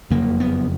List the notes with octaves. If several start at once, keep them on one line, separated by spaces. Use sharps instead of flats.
F#1 F2 C#3 A#3
B3